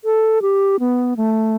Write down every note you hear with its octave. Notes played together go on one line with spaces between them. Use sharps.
A4
G4
B3
A3